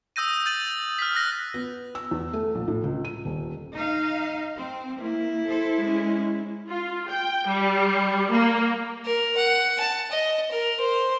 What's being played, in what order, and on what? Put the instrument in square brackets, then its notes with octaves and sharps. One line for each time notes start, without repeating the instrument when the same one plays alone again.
[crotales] D#6 E6 G6 A#6 D#7
G6 A6 D#7 F#7
F6 B6
E6 F#6 A#6
[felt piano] B3
E6
E2
A3
A#1
A2
C#2
D#7
D#1
[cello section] D#4 D#5 F5
C4
[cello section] A#3 [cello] E4
[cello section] A4 C5
G#3 C#4
[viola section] F4
G5
G3
A#3
[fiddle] A#4
F#5
A5
D#5
A#4
C5